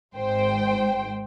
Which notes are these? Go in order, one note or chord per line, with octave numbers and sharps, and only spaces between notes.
G#1 G#2 C5 G5